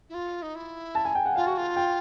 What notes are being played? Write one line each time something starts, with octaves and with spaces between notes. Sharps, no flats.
E4
F4
D#4
E4
A5
G#5
G5
F#5
F4 F5
F#4
F4
G5